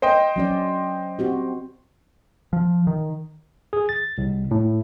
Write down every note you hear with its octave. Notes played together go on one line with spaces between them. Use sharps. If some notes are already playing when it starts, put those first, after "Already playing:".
C5 D#5 G5
F#3 C#4 D5
C4 F#4 G4
F3
D#3
G#4
A6
C2
A2